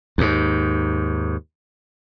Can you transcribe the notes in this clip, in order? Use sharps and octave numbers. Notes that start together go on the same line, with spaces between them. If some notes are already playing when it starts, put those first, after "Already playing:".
D#2 G#2